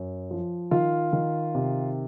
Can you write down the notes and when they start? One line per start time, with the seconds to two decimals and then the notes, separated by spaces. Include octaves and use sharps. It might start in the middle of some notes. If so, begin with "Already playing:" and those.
Already playing: F#2
0.31 F3
0.71 D#3 F4 F5
1.13 D#3
1.55 C3